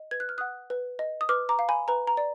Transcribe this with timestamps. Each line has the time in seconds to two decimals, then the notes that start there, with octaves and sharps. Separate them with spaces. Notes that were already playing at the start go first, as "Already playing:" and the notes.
Already playing: D#5
0.11 B4 G#6
0.20 F#6
0.29 F6
0.38 F#5 D#6 F#6
0.70 B4
0.99 D#5
1.21 D#6
1.29 B4 D6 F6
1.49 A#5 D6
1.59 F5
1.69 G#5 B5
1.88 B4 A#5
2.07 A#5
2.17 D5